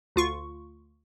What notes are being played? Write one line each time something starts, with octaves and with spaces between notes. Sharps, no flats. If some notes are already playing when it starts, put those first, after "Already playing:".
D2 F4 C#6